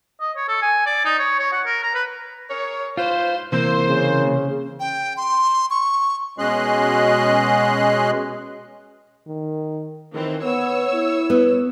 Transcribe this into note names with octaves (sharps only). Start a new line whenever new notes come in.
D#5
C#5
A4
G#5
D5
D#4
C#5
C#5
F#5
A#4
A#5
B4
G#4 A#4 C#5
G#2 F4 B4 C5
C3 E3 A#3 C5
C#3
G5
C6
C#6
B2 G#3 C#4 D#5 C6 F#6
D#3
D#3 E3 C4
B3 C#5 E6
E4
B3